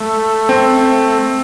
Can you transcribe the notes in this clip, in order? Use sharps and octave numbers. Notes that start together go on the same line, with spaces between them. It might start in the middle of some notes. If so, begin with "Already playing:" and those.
A3
C4